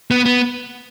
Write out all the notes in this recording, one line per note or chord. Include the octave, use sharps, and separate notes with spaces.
B3
B3